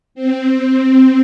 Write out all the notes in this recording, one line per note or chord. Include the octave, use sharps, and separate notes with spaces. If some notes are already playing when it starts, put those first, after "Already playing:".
C4